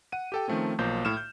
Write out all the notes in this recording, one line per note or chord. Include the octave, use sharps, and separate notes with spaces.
F#5 D#7
G4 A4 G5
D#3 F3 A3 C4 C#4
B1 F3 A#3 C5 G6
A2 F6 E7
G6